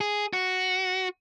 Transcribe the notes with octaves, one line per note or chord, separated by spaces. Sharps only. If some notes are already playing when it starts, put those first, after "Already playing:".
G#4
F#4